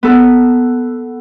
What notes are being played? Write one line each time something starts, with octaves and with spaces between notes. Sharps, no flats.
B3 A4